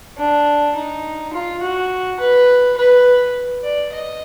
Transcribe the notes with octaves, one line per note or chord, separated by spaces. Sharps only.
D4
D#4
F4
F#4
B4
B4
D5
D#5